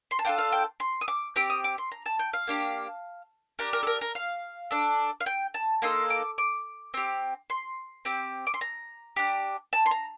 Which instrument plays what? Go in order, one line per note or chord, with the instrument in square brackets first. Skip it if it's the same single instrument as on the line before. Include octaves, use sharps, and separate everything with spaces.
[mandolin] C6
A5
D4 F4 A4 G5
F5
G5
C6
D#6
D6
C4 G4 D6
D#6
D6
C6
A#5
A5
G5
F5
A#3 D4 G4
D4 G4 A#4
A#4
A4
A#4
A#4
F5
D4 A4
F5
G5
A5
A#3 D#4 A4 C6
D6
D6
C4 G4
C6
C4 G4
D6
C6
A#5
D4 G4
A5
C6
A#5